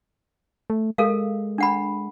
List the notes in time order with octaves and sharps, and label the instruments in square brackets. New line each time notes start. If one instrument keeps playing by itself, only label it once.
[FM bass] A3
[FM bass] G#3 [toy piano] A4 A#4 F5
[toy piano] D4 F#5 B5